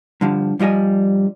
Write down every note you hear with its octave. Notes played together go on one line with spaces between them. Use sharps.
G2 D3 F3
G2 F3 G3 D#5 G#5